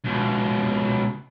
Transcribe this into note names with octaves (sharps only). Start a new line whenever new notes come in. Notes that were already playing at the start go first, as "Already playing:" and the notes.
C#2 B2